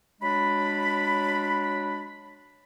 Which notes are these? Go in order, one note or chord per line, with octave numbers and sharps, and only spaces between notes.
F#3 G#3 D4 B5